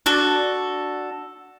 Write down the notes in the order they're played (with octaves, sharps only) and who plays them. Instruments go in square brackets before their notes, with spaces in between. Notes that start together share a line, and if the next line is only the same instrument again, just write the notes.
[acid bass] D4 [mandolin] F#4 A4